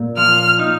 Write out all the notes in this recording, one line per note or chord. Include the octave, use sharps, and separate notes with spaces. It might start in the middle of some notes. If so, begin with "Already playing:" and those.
Already playing: A#2
F3 F6
D#4